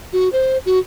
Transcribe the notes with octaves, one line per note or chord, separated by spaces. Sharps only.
F#4
C5
F#4